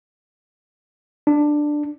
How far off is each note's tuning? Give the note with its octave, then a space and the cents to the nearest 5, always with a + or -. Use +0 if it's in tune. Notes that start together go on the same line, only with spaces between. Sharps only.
D4 +10